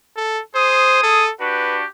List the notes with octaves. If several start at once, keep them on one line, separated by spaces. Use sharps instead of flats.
A4
G#4 C5 D#6
A4
D4 F#4 G4 B4